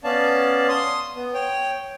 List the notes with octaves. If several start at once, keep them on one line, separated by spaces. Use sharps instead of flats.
B3 C#4 D5 F5 A5
C6 D#6
B3
C#5 G5